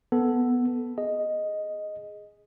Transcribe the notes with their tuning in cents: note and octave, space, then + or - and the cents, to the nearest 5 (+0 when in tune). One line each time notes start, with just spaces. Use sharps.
B3 +0 A4 +0
G#4 +0 D#5 +0